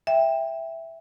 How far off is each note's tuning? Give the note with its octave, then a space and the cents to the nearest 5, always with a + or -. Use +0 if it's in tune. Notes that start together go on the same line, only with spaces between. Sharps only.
E5 +0 G5 +20